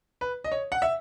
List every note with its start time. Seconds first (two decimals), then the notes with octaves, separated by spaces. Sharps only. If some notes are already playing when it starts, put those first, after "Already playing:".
0.21 B4
0.44 D#5
0.52 C#5
0.72 F#5
0.82 E5